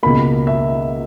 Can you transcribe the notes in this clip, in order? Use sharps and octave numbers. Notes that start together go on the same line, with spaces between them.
C#2 B2 A#3 B5
E5